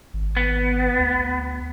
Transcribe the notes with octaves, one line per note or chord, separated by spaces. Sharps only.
G#1
B3
D2